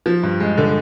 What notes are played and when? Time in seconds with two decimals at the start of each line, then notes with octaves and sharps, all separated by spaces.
0.06 F3
0.23 G2
0.40 G#3
0.57 D3